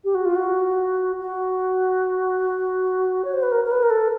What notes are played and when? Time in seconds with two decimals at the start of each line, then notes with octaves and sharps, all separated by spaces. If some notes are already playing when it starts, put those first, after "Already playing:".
0.04 G4
0.15 F#4
0.25 F4
0.36 F#4
1.20 F#4
3.25 C#5
3.33 C5
3.43 B4
3.52 A#4
3.65 A#4
3.71 B4
3.83 A#4
3.90 A4